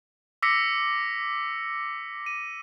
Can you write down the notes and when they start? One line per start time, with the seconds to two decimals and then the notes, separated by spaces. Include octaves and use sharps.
0.42 D6 E6 A#6 B6 C#7
2.26 D#7